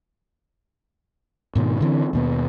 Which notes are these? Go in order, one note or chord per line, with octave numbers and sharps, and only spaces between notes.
G#2 B2 D#3
D3 E3 C4
D#2 B2 B3